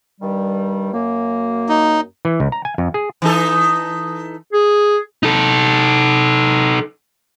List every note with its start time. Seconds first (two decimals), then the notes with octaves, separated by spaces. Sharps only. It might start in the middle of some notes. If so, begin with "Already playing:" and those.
0.21 G2 D#3 G3
0.93 F#2 A#3
1.69 D#4
2.25 E3
2.40 C#2
2.52 A#5
2.65 G#5
2.78 F2
2.94 G#4
3.22 E3 D#4 A4
4.53 G#4
5.23 D#4 A4